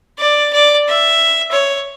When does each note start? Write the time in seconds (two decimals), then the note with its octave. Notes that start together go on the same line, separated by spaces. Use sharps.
0.18 D5
0.53 D5
0.88 E5
1.51 C#5